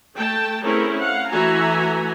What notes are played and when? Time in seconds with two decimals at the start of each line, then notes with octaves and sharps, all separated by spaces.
0.15 A3 G5 A5
0.63 A3 C4 C#4 E4 G#4 A#4
1.01 F5 F#5
1.29 E3 A3 F#4 E5 G#5 A#5